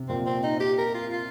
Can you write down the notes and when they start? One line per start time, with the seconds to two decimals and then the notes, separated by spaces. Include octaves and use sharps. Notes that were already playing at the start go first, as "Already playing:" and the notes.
Already playing: C3
0.08 A#2 C4
0.26 C4
0.44 D#4
0.60 G4
0.78 A#4
0.94 F4
1.12 F4